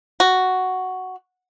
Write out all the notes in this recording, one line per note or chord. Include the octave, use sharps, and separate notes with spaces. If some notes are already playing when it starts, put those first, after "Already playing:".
F#4